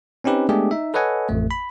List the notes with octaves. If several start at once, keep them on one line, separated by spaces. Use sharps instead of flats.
C4 C#4 D#4 G4 B4
G#3 A3 B3 D4 G4 G#4
D#4 E5
A4 B4 C#5 D#5 F#5 G#5
A1 F2 A3
B5